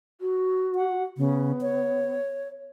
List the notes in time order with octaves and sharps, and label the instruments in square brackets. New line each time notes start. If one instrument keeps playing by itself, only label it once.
[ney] F#4
[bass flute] F#5
[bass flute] C#3 [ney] B3
[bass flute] C#5